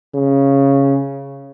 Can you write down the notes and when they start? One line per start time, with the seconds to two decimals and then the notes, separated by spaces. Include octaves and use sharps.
0.14 C#3